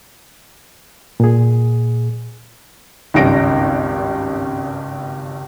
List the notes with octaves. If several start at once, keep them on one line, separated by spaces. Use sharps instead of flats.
A#2 G#4
G#1 C#2 G2 C#4 A#6 D7